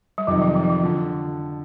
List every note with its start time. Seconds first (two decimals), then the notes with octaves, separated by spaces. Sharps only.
0.18 G3
0.27 F2 C3 D#3 F#3
0.42 F3
0.55 E3
0.64 F3
0.70 E3
0.84 D3 F3